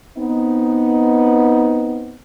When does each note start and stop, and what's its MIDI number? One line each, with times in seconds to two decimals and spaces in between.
0.17 2.17 59
0.17 2.17 60
0.17 2.17 63